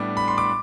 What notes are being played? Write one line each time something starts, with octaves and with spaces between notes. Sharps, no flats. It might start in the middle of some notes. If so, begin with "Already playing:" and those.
Already playing: A2 G3 B3 D4 D6
B5
C6
D6